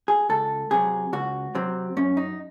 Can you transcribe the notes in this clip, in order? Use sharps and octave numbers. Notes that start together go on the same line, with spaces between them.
G#4
C#2 A4
C3 F#3 G#4
C#2 F#4
C3 F#3 C4
F#2 C#4
D#4